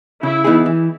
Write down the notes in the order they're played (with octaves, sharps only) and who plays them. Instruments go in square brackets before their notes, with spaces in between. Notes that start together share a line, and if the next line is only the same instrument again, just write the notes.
[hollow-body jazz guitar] C#3 [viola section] E4
[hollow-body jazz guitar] E3 B3 D#4 G#4
E3